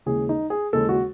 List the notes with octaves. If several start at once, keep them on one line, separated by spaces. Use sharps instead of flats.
D#2 C#3 E3 G#3 G#4
D#4
G#4
D#2 C#3 E3 G#3 A4
F#4